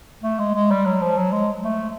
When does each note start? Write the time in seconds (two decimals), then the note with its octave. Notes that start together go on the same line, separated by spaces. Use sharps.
0.23 A3
0.39 G#3
0.55 G#3
0.71 G3
0.85 F#3
1.02 F3
1.17 F#3
1.32 G#3
1.64 A3